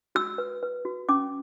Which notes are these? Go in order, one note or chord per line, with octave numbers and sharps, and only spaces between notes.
F#4 E6
B4
B4
F#4
C#4 D6